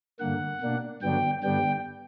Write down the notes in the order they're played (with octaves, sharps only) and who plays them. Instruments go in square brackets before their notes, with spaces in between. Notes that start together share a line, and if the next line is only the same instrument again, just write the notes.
[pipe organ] G2 D3 A#3 F#5
B2 A#3 D4
G2 D3 F#3 B3 D4 G5
G2 D3 G3 B3 D4 G5